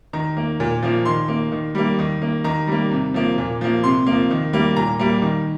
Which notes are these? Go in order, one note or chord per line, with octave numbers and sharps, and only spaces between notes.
D#3 A#5
A#3
A#2
F3 A#3
D#3 C6
A#3
D#3
G3 A#3
D#3
A#3
D#3 A#5
G3 A#3
C3
F3 A#3
A#2
F3 A#3
C3 C6
F3 A#3
D#3
G3 A#3
A#2 A#5
G3 A#3
D#3